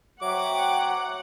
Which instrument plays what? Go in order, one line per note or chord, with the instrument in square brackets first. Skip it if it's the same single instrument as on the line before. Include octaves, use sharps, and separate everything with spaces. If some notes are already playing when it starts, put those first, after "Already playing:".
[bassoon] F#3 [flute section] C5 E5 G5 [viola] F#5 [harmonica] D6